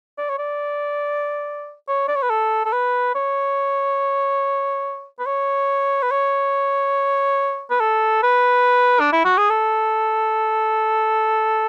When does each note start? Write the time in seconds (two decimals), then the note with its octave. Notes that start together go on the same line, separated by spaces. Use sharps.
0.18 D5
0.29 C#5
0.39 D5
1.88 C#5
2.08 D5
2.16 C#5
2.23 B4
2.30 A4
2.65 A4
2.73 B4
3.15 C#5
5.19 B4
5.26 C#5
6.03 B4
6.11 C#5
7.71 B4
7.80 A4
8.23 B4
9.00 D4
9.13 E4
9.25 F#4
9.38 G#4
9.50 A4